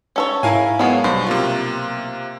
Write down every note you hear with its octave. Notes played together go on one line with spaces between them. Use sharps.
C#4 A4 C#5
G#2 E4 A#4 F5 G#5
F#3 G#3 A#3 B3 C#5
B1 G2 C5
C3 A#3 F4